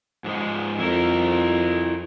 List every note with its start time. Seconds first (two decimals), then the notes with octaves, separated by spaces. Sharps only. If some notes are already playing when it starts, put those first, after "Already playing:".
0.24 G#2 F3 G#3
0.79 F2 E4 A#4